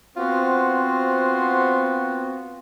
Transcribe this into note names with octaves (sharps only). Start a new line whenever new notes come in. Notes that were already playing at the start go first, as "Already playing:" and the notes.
B3 C4 F4 F#4 C5